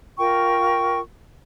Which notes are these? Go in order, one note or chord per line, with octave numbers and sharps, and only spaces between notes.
F4 A#4 G5 C#6